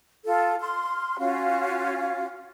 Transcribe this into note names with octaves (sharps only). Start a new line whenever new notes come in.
F4 A4
C6 F6
C#4 F4 F#4 F5